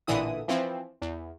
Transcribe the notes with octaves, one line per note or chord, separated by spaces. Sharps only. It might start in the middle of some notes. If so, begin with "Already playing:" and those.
A1 A#2 D3 E3 E4 D#6
E3 F3 C4
E2